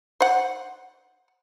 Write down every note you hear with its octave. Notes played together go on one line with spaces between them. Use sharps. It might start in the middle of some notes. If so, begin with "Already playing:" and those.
C5 F#5